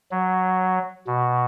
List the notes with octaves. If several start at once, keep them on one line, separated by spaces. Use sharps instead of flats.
F#3
B2